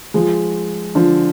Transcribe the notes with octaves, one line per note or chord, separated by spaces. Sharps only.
F3 G#3
D3 F3